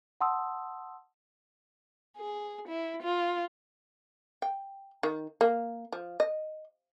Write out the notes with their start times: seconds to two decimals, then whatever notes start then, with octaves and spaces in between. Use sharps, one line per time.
0.21 F#5 A5 C6 D#6 E6
2.17 G#4
2.68 E4
3.03 F4
4.42 G5
5.03 D#3
5.41 A#3
5.93 F3
6.20 D#5